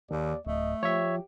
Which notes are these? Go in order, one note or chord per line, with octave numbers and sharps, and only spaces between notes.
D#2 D#3 D5
D1 A3 D#5
F3 G4 C#5 E5